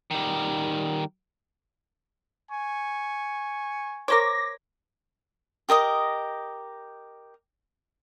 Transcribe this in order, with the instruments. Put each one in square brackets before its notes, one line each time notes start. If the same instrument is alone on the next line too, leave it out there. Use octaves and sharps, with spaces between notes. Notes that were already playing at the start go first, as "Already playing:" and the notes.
[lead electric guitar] D#3 G3
[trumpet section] G#5 C#6
[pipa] A#4 C5 C#5 [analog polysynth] D6 A#6
[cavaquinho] G4 A#4 D#5 D#6